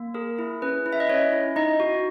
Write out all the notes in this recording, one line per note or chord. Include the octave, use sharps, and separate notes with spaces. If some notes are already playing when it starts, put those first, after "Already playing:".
Already playing: A#3
G#4 A#4
E4
C#4 B4
E4
E5
D#5
C#4 C#5
E4
D#4 D#5
F#4